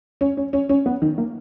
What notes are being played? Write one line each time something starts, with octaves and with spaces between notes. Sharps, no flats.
C#4
C#4
C#4
C#4
B3
D#3
A#3